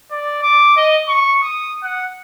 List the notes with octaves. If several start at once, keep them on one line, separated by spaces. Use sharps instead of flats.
D5
D6
D#5
C#6
D#6
F#5